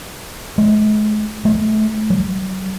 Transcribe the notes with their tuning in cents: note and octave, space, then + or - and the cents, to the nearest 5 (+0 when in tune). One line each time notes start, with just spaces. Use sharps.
G#3 +40
A3 -30
F#3 +35